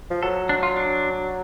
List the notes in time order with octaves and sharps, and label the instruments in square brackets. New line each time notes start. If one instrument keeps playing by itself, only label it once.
[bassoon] F3
[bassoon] F#3 [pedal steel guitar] A4
[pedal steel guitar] D4
F4
D4